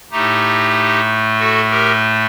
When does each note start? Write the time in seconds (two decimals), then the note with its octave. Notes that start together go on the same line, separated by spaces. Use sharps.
0.11 A2 A3 D#4 G4
1.38 F#4 A4
1.70 G4 A#4